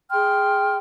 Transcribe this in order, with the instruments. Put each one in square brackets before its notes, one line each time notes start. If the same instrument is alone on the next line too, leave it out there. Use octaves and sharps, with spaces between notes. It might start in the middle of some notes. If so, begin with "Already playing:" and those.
[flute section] G#4 G5 C6 F6